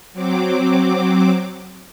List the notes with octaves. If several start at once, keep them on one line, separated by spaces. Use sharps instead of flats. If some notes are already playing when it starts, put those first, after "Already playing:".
F#3 C4 D6